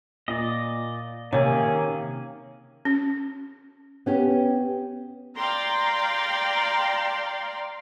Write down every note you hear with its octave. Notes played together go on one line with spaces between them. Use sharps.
A#2 D5 D#5
C3 D#3 A#3 C#4 G#4 C#5
C#4
B3 C#4 G4
D5 F5 G5 A#5 C6